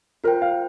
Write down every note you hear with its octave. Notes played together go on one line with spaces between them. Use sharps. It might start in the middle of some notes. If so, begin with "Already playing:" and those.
F4 A#4 C5 G5
F5